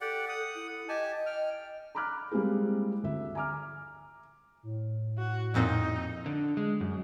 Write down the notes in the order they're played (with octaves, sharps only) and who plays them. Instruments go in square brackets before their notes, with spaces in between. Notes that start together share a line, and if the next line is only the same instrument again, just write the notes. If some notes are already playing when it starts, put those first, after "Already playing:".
[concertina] G4 D5 F#5 [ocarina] A4
[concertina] F#5 D#6
[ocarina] E4
[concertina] G4 G#5 A5 [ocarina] D#5
[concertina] G5 F6
[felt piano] A#5 B5 D6 F6 F#6
G3 G#3 A#3 C4 E4 G#4
D2 E5
G#5 A#5 D6 F6
[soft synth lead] A2
[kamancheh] F#4
[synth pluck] F2 A#2 C4 [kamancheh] D#4
[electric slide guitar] D3
G#3
F#2